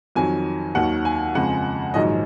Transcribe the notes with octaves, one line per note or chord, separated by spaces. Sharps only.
F2 D#3 F#3 G#5
D#2 D#3 F#3 F#5
G#5
F2 C#3 G#3 F#5
A#1 G#2 D#3 F#3 D#5